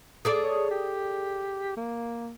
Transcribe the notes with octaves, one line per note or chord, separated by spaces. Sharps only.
G#4 A4 D5
C#5
G4
A#3